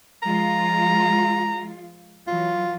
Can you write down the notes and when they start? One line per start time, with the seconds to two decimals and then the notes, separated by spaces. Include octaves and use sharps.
0.23 F3 G#3 F4 A#5
2.27 E3 F#3 F4